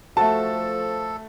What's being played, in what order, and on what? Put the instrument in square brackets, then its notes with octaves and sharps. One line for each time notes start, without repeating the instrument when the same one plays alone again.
[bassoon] F3 [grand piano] A3 F#4 [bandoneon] A4 [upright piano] A5